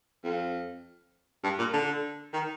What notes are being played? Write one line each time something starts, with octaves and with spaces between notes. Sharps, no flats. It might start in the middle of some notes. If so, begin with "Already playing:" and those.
F2
G2
A#2
D3
D#3